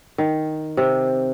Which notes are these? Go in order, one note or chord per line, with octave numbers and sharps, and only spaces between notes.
D#3
C3